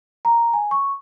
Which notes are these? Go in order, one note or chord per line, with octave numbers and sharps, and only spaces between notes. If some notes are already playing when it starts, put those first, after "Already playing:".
A#5
G#5
C#6